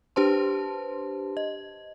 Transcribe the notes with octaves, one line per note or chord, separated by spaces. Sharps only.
D4 G4 B4 C5 A5 C6
D#5